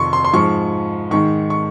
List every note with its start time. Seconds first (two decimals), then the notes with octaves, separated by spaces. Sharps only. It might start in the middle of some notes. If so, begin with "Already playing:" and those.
Already playing: F2 C3 D#3 C6 C#6
0.13 C6
0.25 C6
0.34 G#2 F3 C#6
1.11 G#2 D#3 C#6
1.50 C#6